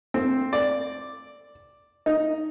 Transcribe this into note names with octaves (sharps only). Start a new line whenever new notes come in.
C4
D5
D#4